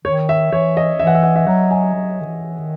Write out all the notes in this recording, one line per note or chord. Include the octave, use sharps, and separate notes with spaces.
D#3 C#5
E5
E3 C#5
D#5
E3 E5
F#5
E5
F#5
E5
F#3 F#5
G#5
F#3
D#3
E3
D#3